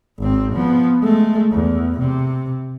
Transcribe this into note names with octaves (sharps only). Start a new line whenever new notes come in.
G#1 C4
F3 B3
G#3 A3
E2
C3